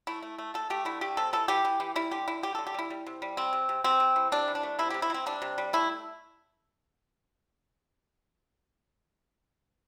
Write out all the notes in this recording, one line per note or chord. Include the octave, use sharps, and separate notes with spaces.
A3 E4
A3
A3
A3 A4
A3 G4
D3 E4
A3 G4
C3 A4
E3 A4
E3 G4
E3
E3
G3 E4
D3 G4
D3 E4
G3 G4
D3 A4
G4
G3 E4
G3
C3
G3
C3 C4
C3
C3
C3 C4
C3
E3
C3 D4
E3
D4
A3
C3 E4
C3 G4
E4
C3 C4
G3 D4
C3
G3
A3 E4